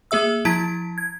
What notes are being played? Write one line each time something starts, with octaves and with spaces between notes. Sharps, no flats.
A#3 G#4 E5 E6
F3 E4 A5 G#6 B6 D7
G#6